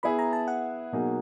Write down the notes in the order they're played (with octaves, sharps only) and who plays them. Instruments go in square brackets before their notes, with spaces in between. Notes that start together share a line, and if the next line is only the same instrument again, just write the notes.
[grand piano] B3 E4 G#4 [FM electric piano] B5
[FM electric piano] A#5
A5
F#5
[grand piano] B2 F#3 A#3 D#4 G#4